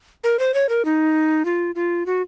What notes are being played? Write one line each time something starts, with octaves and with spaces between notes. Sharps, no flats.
A#4
C5
C#5
A#4
D#4
F4
F4
F#4